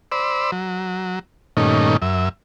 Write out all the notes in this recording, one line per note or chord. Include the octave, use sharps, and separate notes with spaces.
C5 D5 B5 E6
F#3
G2 A#2 D#3 A3 C#4 D#4
F#2 E5